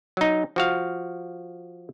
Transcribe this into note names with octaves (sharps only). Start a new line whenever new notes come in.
F#3 D#4
F3 F#4 F5